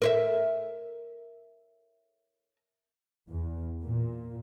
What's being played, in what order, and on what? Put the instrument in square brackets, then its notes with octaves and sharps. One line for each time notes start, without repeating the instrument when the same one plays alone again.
[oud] A#4 C5 E5
[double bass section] E2
A#2